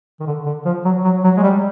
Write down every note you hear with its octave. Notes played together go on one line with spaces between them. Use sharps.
D#3
D3
D3
F3
F#3
F#3
F#3
G#3
G3